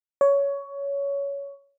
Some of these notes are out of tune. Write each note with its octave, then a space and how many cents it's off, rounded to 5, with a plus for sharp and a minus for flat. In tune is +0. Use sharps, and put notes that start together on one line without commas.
C#5 +15